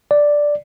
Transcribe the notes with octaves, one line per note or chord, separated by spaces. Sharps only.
D5